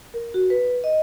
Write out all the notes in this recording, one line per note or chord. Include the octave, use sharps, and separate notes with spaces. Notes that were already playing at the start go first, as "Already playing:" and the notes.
A#4
F#4
B4
D#5